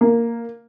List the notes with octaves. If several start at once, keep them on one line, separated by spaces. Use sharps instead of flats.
A#3